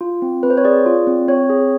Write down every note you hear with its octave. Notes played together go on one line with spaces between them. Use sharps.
F4
C4
C4 B4
C5
C#5
G#4 D5
F4
C4
C4 C#5
G#4